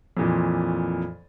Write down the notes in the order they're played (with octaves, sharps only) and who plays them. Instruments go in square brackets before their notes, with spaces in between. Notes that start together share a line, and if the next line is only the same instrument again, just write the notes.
[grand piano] F2 A#2 E3